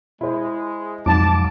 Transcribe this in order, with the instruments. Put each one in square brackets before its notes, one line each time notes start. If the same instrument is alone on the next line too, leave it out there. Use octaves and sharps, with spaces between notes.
[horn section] G#3 [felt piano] E4 C5
[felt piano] B1 G#2 [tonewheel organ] F2 D6 [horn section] A5